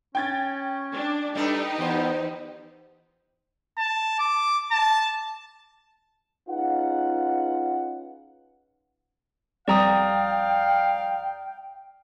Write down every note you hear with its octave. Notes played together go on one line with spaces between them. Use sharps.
C#4 G5 G#6 A6
D4
G3 A3 D4 D#4 G4 B4
E2 B3 C5
A5
D6
A5
C#4 D#4 F4 G#4 B4 F#5
F2 G3 D5 F5 G5 A#5 D#6